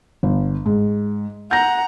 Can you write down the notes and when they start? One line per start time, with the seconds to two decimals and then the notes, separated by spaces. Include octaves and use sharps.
0.23 G1
0.66 G#2
1.51 F#5 A#5 G6 A#6